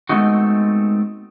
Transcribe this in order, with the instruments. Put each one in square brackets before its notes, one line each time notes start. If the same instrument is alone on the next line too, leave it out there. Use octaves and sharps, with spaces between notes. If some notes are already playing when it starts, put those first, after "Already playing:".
[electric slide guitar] G#3 A3 B3 C4 D#4 F#4